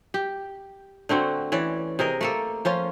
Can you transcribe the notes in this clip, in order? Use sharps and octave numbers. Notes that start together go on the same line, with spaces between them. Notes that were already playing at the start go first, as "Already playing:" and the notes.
G4
D3 A3 C4 F#4
E3 C#4 D5
C3 G#4 A#4 D#5
A3 A#3 A4
F3 C#4 F4